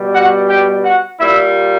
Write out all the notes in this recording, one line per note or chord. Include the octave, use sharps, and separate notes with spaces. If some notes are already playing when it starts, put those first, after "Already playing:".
Already playing: B2 G3
F#4 F#5
G4 G5
F#4 F#5
A#2 G3 E4 E5